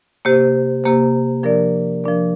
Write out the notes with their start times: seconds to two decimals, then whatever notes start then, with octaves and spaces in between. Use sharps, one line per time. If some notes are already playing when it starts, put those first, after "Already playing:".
0.25 C3 A#3 G4 C5
0.84 C3 A#3 G4 C5
1.43 F3 D4 A#4 D5
2.04 F3 D4 A#4 D5